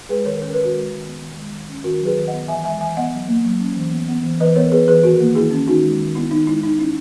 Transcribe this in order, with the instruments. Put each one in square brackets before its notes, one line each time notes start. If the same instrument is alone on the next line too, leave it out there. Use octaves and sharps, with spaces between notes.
[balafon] G#3 G#4 B4
D#3 A#4 C#5
C#4 A#4
D#3 B4
F#4 A#4
G#3
D#3
B3
D#3
G#3
D#3
C#4
D#3 F#4 A#4
F#3
G#4 B4
D#3
B3 D#5 F#5
E3 E5 G#5
G#3 E5 G#5
E3 E5 G#5
B3 D#5 F#5
F#3
A#3
F#3
C#4
E3
B3
B3
E3
E3 B4 D#5
B3 A#4 C#5
B3 G#4 B4
E3 G#4 B4
D#3 F#4 A#4
A#3
D#3 E4 G#4
C#4
D#3 D#4 F#4
G#3
D#3
B3 E4
D#3 D#4
G#3 E4
D#3 D#4
C#4 E4